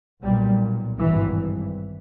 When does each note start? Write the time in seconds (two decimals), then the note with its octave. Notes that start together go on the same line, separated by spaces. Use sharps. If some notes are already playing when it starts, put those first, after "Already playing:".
0.23 B1 A#2 G3
0.98 G#1 G2 E3